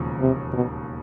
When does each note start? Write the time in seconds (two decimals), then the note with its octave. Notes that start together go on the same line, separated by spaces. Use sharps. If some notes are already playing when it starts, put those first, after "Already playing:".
Already playing: E1 D#2 C#3 F3
0.21 C3
0.53 B2